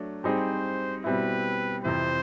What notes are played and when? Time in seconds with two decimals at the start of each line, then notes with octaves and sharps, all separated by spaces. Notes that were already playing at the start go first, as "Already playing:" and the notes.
Already playing: F#3 A3 D4
0.24 G3 C4 D#4 G#4 C5
1.04 B2 G3 C4 E4 B4
1.85 F2 C3 E3 C5